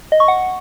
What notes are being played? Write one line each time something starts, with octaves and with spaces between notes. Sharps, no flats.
D#5
C#6
F#5